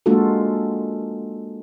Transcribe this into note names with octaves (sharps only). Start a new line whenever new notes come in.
G#3 A#3 D4 F4 F#4 A4